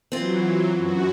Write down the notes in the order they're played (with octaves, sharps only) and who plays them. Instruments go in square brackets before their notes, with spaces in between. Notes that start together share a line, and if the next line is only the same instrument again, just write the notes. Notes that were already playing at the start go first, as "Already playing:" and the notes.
[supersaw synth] E3 F#3 [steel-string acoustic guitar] C4 F4
[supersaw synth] F#2 F#4